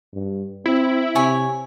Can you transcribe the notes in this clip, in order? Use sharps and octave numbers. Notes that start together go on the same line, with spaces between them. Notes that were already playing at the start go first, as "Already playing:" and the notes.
G2
C4 E4
C3 C#5 G#5